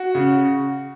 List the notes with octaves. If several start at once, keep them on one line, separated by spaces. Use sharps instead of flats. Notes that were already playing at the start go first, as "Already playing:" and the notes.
Already playing: F#4
C#3